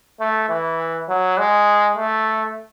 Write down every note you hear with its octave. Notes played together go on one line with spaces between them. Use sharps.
A3
E3
F#3
G#3
A3